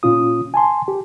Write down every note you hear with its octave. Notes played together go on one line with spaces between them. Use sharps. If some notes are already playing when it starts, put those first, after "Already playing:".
A#2 C#4 F4 D#6
G#5 A5 C6
G4